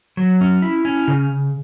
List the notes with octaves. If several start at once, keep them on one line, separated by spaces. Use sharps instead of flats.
F#3
C#4
E4
C#4
C#3